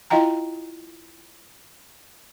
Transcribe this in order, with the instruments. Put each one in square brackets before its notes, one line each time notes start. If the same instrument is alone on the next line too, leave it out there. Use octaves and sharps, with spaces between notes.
[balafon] E4 F4 D#5 F5 G5 A#5